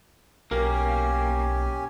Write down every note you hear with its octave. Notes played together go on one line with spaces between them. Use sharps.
B1 A#3 C#4 G4 A#4 G#5